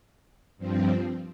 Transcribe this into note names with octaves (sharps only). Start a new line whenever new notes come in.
G2 F3 C4